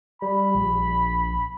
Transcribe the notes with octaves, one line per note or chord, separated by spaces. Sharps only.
G3 B5
A#1